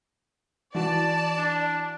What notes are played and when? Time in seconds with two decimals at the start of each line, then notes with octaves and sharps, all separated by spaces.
0.75 E3 F#4 D5 A5
1.38 D4